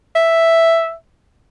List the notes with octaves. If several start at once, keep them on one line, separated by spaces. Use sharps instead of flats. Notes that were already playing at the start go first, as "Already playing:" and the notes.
E5